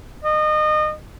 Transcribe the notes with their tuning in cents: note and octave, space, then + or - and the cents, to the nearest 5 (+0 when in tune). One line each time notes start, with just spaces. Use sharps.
D#5 -30